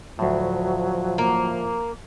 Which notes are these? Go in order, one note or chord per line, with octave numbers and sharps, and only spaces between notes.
D2 A2 F3 F#3
A#3